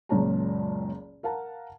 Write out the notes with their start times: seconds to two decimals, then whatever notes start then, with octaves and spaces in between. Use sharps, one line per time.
0.09 F#1 C#2 A#2 C#5 A5 A#5
1.23 A#4 F5 F#5 A5 A#5